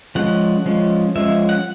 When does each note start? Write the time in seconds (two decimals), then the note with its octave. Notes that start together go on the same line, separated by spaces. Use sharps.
0.15 F3 G#3 C#4 F#5
0.65 F3 G#3 C#4
1.15 F3 G#3 C#4 E5
1.49 F#5